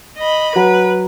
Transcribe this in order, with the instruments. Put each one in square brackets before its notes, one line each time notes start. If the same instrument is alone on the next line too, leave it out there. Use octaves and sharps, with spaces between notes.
[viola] D#5 B5
[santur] F#3 [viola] B4